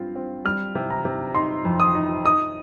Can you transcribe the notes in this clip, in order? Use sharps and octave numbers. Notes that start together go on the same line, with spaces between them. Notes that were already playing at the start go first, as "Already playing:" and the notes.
Already playing: G2 C4 F4
C4
G3 F6
C3
A#5
C3
D#4 C6
F2
D#6
D#4
D#4 D#6